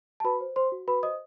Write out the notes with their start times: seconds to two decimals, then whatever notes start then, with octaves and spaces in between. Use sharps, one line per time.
0.20 A5
0.24 F#4 B4 B5
0.41 C5
0.56 C5 C6
0.72 F#4
0.88 F#4 B4 B5
1.03 C5 D#5 D#6